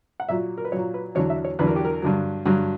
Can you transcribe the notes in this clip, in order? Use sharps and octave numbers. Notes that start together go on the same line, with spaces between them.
F#5
A#2 F#3 E5
A#4
B4
A#2 F#3 C#5
B4
E2 D3 F#3 C#5
E5
C#5
E2 D3 F#3 B4
A#4
G4
A#4
G2 D3 F#3
G2 D3 F#3 F#4